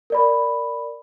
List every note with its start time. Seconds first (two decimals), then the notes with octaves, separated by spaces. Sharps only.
0.10 A#4 D5 B5